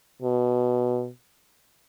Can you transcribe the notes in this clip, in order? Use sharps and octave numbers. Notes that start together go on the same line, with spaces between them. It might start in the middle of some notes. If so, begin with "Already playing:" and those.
B2